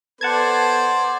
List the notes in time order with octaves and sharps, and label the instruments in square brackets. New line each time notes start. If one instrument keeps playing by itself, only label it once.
[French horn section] B3 A4 B4 [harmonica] C5 D5 [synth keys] F#5 A5 G#6